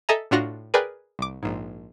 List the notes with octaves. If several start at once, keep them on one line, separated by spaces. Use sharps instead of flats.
A4 D#5 E5 G#5 A#5
A2 D4 F4 F#4 F6 A#6
G#4 A#4 B4 D5 G5 G#5
C2 D6
A#1 G#2